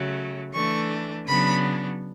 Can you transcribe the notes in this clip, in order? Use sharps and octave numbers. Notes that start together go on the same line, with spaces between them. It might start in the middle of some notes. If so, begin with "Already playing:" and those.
Already playing: C#3 F#3 A3
E3 A3 D4 C#6
C#3 F#3 B3 D4 B5